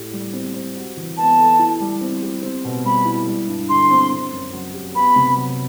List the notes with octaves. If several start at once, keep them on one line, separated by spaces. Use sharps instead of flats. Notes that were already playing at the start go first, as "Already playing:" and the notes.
Already playing: A2 G4
G3
C4
C5
F#4
E3
B3 A5
A4
E4
G3
C4
G4
C4
B2
G3 B5
E4
G3
G2
D3 C6
C4
C4
F#2
F#3
G4
B3 B5
C3
F#3